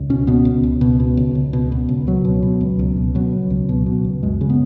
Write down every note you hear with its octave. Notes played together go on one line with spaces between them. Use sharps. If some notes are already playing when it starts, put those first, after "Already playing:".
Already playing: C#2
B2 C#4
B2 B3
C#2
C#2
B2
B2
C#2
C#2
B2
B2
C#2
C#2 F#3
B2
B2
C#2
C#2
B2
B2 F#3
C#2
C#2
B2
B2
C#2
F#2 G#3
C#3
B3